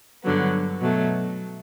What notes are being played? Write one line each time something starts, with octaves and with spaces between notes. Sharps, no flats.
G2 D3 F#3 B3
B2 F#3 A3